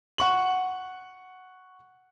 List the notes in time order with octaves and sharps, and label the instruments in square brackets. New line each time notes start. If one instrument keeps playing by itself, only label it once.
[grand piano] F#5 C#6 F#7